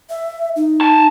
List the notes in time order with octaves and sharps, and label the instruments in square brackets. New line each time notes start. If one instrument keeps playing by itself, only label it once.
[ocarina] E5
D#4
[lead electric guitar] G#5 A5